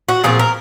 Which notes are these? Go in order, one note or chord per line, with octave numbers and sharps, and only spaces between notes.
F#4
A#2 F3 C4 G#4
A#4